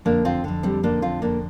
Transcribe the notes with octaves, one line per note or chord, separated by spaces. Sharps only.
F2 D3 A#3 D4
C4 F4
F2 D3
G3 C4
F2 D3 A#3 D4
C4 F4
F2 D3 A#3 D4